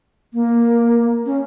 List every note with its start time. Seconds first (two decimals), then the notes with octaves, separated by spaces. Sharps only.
0.34 A#3
1.26 C#4